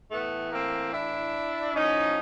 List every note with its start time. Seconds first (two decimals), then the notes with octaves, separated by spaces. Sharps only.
0.11 A2 E3 A3 B3
0.51 A#3 C4
0.92 D4 E4
1.74 A2 F3 C#4 D#4